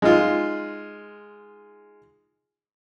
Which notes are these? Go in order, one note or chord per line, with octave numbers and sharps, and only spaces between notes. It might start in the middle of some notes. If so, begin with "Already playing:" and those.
G#3 D#4 F4